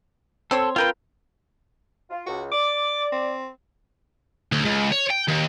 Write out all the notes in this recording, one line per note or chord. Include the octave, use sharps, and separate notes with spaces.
C4 A4 C5 C#5
C4 F4 A#4 B4 G5
F4
C#2 F#4
D5 D6
C4
D2
C#2
C#5
G5
D#2